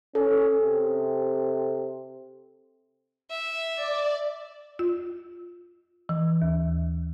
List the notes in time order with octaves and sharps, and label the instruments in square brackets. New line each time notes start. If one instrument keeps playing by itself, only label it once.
[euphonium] C#4 [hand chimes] A4
[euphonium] C3
[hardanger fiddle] E5
[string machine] D5
[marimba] F4
E3
D#2